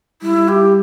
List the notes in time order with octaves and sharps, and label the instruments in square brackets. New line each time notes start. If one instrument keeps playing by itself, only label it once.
[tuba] G3 [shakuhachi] E4
[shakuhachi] G4